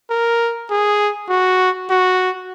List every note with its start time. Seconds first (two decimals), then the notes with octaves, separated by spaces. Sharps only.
0.11 A#4
0.71 G#4
1.29 F#4
1.90 F#4